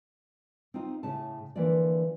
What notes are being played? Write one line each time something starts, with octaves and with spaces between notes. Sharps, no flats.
C4 D#4 F4
A2 C#3 A5
D3 E3 F3 A#3 F4 D5